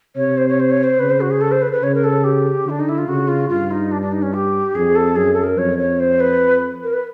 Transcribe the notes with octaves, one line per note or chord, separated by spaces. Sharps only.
C3 C#5
C5
C#5
C5
C#5
C5
C#3 B4
C5
F#4
G#4
A4
C5
B4
B4
C#3 C#5
A#4
A4
G4
D3 D4
D#4
E4
F4
C#3 F#4
F4
G2 F4
D#4
D4
D4
D#4
C#4
G4
F2 G#4
A4
F#2 G#4
A4
A#4
F2 C#5
C#5
C5
B4
A#4
B4